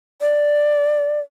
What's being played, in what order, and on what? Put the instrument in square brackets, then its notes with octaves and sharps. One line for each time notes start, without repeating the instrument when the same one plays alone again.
[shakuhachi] D5